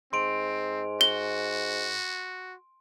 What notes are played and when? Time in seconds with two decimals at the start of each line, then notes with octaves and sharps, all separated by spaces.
0.13 G#2 C4 C6 D7 F7
1.01 F#4 G7